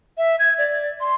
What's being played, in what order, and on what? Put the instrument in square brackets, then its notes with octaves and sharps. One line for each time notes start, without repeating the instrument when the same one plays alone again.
[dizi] E5
G#6
D5
C6